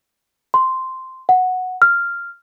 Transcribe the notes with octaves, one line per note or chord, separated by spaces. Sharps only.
C6
F#5
F6